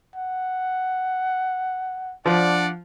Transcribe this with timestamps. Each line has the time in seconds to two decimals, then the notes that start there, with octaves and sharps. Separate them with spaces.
0.16 F#5
2.26 F3 D4 D5 F#5